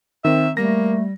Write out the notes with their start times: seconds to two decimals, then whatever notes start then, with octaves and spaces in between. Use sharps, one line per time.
0.25 D#3 C4 E5
0.57 G3 A3 A#3 A#6